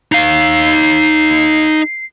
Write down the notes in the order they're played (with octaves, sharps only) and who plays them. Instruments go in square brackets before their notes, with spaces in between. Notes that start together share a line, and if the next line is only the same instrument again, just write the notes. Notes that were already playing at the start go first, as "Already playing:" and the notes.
[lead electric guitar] D#4 F5 [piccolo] C7